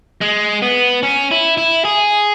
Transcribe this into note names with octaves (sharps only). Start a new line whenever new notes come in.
G#3
B3
C#4
E4
E4
G#4